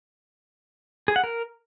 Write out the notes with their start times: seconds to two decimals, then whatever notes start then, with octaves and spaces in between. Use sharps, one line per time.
1.08 G#4
1.16 F#5
1.24 A#4